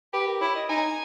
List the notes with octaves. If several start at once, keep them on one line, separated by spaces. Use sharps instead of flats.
G4 B4
A#4
E4 C#5
D#5
D#4 G#5